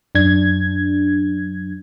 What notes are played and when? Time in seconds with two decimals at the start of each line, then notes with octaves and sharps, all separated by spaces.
0.15 F#2 D4 G#6